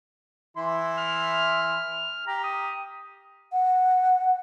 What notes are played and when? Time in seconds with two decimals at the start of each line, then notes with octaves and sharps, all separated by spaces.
0.57 E3 E4 C6
0.98 F6
2.27 G4 A#5
2.44 D#6
3.52 F#5